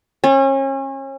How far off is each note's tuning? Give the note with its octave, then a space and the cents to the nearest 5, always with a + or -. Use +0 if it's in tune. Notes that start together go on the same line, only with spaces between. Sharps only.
C#4 -35